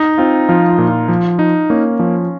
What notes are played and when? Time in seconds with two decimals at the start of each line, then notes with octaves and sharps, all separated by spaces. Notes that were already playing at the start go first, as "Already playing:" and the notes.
Already playing: D#4
0.18 C4 F4
0.49 F3 F4
0.69 F4
0.78 A#2
0.88 F4
1.08 F3
1.39 D#4
1.70 A#3 C#4
1.99 F3 C#4